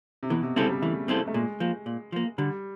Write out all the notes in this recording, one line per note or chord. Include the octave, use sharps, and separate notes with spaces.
C3
B2 E3
C3
C#3 G3 C4 E4 A4
G3
E3 A3
G3 C4 E4 A4
A3
A#2 G#3
F3 A#3
A#2
F3 A#3
D3 G3